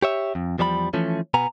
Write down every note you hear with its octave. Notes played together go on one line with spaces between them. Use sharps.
G4 C#5 E5
F2
E2 F3 G3 C#5 B5
E3 F3 A3 C#4
B2 B3 G#5 A#5